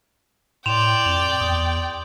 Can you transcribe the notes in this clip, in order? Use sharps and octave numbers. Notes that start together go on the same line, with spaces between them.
A2 D5 G5 C6 E7 F7
F2 F7
E2 D#6